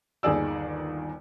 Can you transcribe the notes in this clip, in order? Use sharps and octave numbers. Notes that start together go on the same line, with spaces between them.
G1 D#2 D#3 G#4 D5 E6